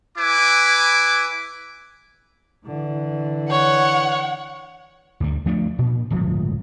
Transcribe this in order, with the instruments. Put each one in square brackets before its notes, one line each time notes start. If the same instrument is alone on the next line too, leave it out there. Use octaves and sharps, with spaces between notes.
[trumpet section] E4 B4 G#5 D6
[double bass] D3 E3
[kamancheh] C#5 [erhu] F#5
[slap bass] D2 G2
F3 A3 D4
A#2
D1 G1 C#2 F3